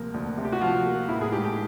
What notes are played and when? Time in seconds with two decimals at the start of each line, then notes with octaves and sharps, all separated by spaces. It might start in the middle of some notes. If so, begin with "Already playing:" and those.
Already playing: D2 C3 F3 A#3
0.14 D2
0.38 C3
0.45 G4
0.52 F#4
0.61 F3 F4
0.86 A#3
1.09 A1 E4
1.21 G#4
1.32 G#2 G4
1.45 G4